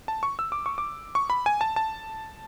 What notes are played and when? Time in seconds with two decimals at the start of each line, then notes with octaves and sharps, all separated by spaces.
0.08 A5
0.23 C#6
0.39 E6
0.52 D6
0.66 C#6
0.78 D6
1.15 C#6
1.30 B5
1.46 G#5
1.61 A5
1.76 A5